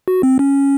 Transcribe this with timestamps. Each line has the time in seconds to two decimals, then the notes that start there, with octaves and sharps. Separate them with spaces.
0.08 F#4
0.23 C4
0.39 C#4